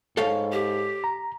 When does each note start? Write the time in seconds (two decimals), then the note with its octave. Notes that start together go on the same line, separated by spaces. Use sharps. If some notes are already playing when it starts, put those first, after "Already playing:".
0.17 G#2 A4 C#5 F5
0.52 G4
1.04 A#5